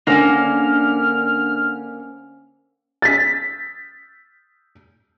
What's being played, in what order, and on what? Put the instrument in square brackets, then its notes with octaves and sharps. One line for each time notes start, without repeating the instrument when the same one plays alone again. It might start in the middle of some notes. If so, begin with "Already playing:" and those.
[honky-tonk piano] D3 [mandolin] A#3 [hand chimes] C#4 C5 G#5 [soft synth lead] F6
[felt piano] A6 B6